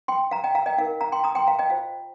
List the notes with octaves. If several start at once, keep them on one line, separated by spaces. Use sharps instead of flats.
G5 C6
F5 A#5
D#5 G5
F5 A#5
D#5 G5
D#4 A#4 F5
F5 A#5
G5 C6
A#5 D#6
G5 C6
F5 A#5
D#5 G5
F4 C5 F5